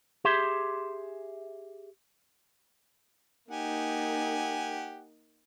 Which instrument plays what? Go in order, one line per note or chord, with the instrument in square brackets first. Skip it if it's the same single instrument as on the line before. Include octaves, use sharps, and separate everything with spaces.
[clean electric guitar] G4 G#4 E5 C6
[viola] A#3 D#4 [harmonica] G4 F#5 G#5